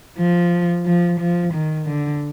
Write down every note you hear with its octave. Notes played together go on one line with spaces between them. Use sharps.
F3
F3
F3
D#3
D3